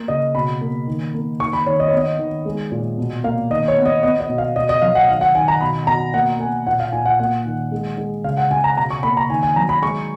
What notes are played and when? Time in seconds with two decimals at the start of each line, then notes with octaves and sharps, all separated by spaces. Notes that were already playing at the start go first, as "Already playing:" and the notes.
Already playing: A#3
0.08 C#3 D#5
0.35 B2 B5
0.61 A#3
0.87 D#3
1.14 A#3
1.40 D#3 C#6
1.53 B5
1.66 D#3 C#5
1.80 D#5
1.88 C#5
1.93 B3 D#5
2.19 D#3
2.45 G#3
2.72 A#2
2.98 B2
3.24 A#3 F5
3.50 D#3 D#5
3.68 C#5
3.77 B3
3.86 D#5
4.03 B3 D#5
4.20 D#5
4.29 B2
4.38 F5
4.56 B2 D#5
4.69 D#5
4.82 F#3 F5
4.95 F#5
5.08 D#3 F5
5.21 F#5
5.35 D#3 G#5
5.48 A#5
5.61 B2 B5
5.87 B2 A#5
6.14 A#3 F#5
6.40 A#3 G#5
6.67 A#2 F#5
6.80 F5
6.92 A#2 G#5
7.06 F#5
7.19 A#3 F#5
7.45 D#3
7.72 G#3
7.98 G#3
8.24 C#3 F5
8.37 F#5
8.51 C#3 G#5
8.64 A#5
8.77 B2 A#5
8.90 C#6
9.03 A#3 B5
9.17 A#5
9.30 D#3 G#5
9.43 G#5
9.56 F#3 A#5
9.69 B5
9.82 G#3 C#6